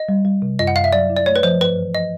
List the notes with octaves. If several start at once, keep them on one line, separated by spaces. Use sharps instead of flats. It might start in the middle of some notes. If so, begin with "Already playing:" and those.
Already playing: D#5
G3
G3
C3
F#2 D#5
F#5
F#2 F5
E5
F#3 D5
E4
D5
A3 C#5
B4
F3 C5
G2 B4
E3
F3 D#5